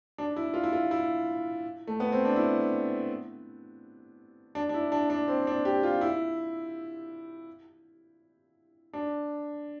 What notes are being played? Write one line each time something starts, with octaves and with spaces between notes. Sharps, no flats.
D4
E4
F4
E4
F4
E4
A3
B3
C4
D4
E4
D4
D4
E4
D4
D4
C4
D4
G4
F4
E4
D4